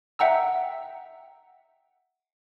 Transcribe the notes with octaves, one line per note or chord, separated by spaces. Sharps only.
E5 F#5 G5 A#5 E6